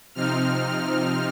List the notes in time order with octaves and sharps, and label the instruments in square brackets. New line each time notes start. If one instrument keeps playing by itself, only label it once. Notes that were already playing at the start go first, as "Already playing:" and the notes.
[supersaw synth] C3 F3 C4 D#4 F6